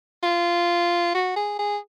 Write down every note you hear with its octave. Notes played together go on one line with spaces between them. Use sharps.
F4
F#4
G#4
G#4